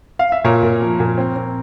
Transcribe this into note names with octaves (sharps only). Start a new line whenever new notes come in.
F5
E5
A#2 A#4 C#5
A#2
F3
A#2
C4
C4